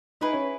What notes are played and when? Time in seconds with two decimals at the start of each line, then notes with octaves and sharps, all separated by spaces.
0.21 D#4 E4 G#4 B4
0.33 C#4